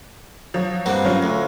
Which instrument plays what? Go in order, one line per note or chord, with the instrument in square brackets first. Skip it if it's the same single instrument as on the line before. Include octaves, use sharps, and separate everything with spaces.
[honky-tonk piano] F3 F#3
[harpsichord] G2 A#3 C4 [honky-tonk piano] F#5
[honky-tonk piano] F#3 C#4 F4
[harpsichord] D2